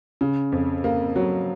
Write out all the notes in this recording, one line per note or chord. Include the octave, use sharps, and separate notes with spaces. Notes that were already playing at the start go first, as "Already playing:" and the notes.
C#3
F2
A#3
F#3